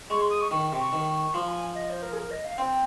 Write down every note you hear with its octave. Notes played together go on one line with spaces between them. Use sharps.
G#3 C#6
C6
D#6
C#6
D#3 C#6
C3
C#6
D#3
F3 C6
G#5
D#5
C5
A#4
G#4
A#4
D#5
F5
C4 G5